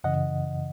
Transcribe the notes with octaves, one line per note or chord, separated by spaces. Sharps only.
F#2 C#3 E3 D#5 F#5